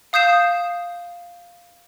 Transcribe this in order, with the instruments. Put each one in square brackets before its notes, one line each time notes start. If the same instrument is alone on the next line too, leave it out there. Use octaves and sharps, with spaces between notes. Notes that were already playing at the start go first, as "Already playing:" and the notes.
[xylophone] F5 D#6 G6 C7 E7